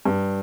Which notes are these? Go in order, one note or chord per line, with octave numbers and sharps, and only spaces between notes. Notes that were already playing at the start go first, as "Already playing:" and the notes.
G2